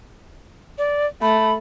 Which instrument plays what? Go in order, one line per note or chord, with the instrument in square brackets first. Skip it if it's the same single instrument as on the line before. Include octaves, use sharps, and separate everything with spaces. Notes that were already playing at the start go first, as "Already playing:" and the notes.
[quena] D5
[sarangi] A3 [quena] B5